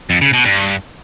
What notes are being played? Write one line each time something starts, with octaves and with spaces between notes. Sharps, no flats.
F2
C#3
B2
G2